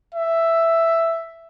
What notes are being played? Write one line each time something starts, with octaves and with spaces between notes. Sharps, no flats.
E5